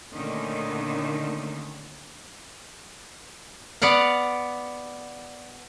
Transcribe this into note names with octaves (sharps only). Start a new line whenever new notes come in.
A#2 D3 D#3 A3 C#4 D#4
B3 D5 F5 F#5